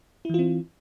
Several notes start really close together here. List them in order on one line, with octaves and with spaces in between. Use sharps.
E4 E3 F4 C4